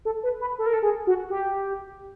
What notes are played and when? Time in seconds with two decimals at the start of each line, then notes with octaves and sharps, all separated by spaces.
0.05 A4
0.23 B4
0.41 B4
0.59 A4
0.66 A#4
0.73 A4
0.82 G#4
1.07 F#4
1.30 G4